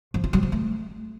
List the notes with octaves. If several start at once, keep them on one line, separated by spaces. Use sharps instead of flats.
F3
F4
F#3
F3
A3